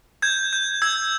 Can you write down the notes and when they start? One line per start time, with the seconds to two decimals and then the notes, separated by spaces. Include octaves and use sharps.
0.22 G6 G#6
0.53 G6
0.82 E6 G#6